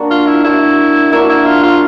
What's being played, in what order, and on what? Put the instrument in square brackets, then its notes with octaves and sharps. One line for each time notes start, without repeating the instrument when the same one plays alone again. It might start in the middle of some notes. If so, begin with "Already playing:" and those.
Already playing: [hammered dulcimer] A#3 D4 F#4
[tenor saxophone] F4
E4
[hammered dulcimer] A#3 D4 F#4 [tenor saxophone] E4
[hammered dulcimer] A#3 D4 F#4 [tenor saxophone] E4
[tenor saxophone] E4
F4
F4